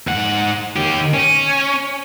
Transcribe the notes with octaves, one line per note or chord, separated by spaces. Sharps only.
G#2 F#5
D#3 G4
C#4